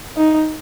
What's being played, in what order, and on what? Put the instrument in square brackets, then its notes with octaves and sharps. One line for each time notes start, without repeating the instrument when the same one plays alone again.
[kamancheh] D#4